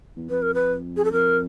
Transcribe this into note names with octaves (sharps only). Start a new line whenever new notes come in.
E2
F2 B4
A#4
B4
G#4
A4
F2 A#4